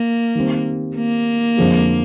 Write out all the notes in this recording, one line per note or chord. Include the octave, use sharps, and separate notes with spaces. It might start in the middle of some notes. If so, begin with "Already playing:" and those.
Already playing: A#3
D#3 G3 C4
A#3
F2 D3 F3 G#3